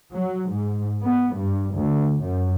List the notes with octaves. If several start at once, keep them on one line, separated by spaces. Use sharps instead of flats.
F#3
G#2
B3
G2
D2
F#2